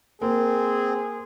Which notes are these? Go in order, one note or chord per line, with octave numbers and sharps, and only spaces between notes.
A#3 C4 G#4